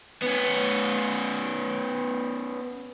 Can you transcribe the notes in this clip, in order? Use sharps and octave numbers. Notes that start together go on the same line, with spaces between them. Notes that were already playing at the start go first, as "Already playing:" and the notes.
B3 C#4